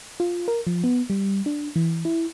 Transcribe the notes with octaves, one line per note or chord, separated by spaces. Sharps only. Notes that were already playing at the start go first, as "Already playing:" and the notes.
F4
A#4
F3
B3
G3
D4
E3
E4